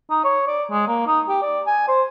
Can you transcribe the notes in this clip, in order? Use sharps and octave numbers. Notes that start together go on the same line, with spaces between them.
D#4
C#5
D5
G#3
A#3
D#4
G4
D5
G#5
C5